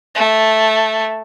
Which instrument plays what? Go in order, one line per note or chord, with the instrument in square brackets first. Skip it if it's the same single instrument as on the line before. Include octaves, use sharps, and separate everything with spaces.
[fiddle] A3